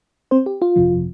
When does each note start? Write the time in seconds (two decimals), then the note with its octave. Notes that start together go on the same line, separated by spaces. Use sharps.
0.31 C4 C5
0.46 G4
0.62 F4
0.76 G1 F2 C3 F3